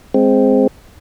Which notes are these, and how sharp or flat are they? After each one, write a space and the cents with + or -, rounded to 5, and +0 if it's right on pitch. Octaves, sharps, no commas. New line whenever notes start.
G#3 +0 C4 +0